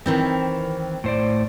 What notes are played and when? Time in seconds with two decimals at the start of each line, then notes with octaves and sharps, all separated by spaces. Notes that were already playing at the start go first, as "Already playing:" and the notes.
0.06 D#3 E3 C4
1.04 A2 C5 D5